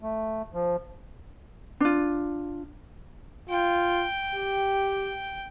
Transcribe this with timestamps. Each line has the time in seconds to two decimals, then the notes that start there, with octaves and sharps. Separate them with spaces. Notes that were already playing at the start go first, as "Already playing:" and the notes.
0.02 A3
0.54 F3
1.81 D4 F4
3.50 F4 G5
4.35 G4